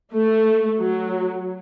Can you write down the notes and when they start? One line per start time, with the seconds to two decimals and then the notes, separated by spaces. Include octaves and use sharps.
0.15 A3
0.79 F#3